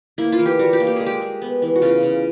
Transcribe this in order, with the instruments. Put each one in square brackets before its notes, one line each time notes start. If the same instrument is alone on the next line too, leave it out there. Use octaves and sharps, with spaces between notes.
[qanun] A#3 E4
F4
E3
G4
G3 F#4
G4
A#3
G4
G#3 G#4
G4
G#3
B3
E3
F#4
C#3 F4
C#3